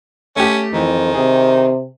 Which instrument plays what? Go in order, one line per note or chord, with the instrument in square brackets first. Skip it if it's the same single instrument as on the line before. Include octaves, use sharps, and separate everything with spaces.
[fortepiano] A3 G4 [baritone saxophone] C#4
[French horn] F2 [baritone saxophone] D#3 [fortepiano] E3
[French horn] C3 [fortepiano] G#4